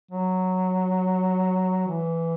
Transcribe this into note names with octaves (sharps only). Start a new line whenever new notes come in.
F#3
E3